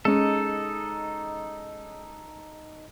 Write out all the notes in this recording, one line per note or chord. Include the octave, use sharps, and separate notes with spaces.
G#3 C#4 D#4 A4